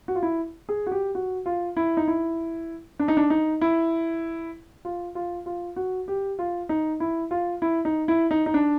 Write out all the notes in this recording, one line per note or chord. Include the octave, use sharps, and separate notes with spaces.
F#4
F4
E4
G#4
F#4
G4
F#4
F4
E4
D#4
E4
D4
D#4
D4
D#4
E4
F4
F4
F4
F#4
G4
F4
D#4
E4
F4
E4
D#4
E4
D#4
D#4
D4